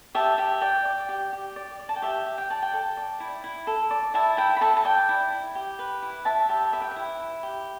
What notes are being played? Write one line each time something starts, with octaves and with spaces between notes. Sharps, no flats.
G4 E5 A5
G4 E5
D5 G5
D5
G4
G4
D5
D5
A5
G5
G4 E5
G4
G5
D5 A5
G5
A4
D5
E4
E4
A4
D5
E4 E5 A5
E4 G5
B5
A4 E5 A5
A5
D5 G5
E4
E4
G4
B4
E4
E4 E5 A5
G4 E5 A5
B4 E5
G5
E5
E4
E4
G4